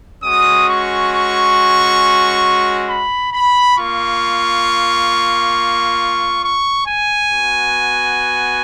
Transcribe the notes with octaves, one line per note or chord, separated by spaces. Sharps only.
G#3 C#4 F#4 D#6
C#6
C#6
B5
B5
A#3 F4 C#6
C#6
G#5
B3 F#4